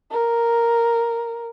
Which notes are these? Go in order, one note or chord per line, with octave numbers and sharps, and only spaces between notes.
A#4